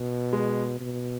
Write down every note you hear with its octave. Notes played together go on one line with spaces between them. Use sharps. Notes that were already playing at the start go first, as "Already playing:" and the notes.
Already playing: B2
G#3
B2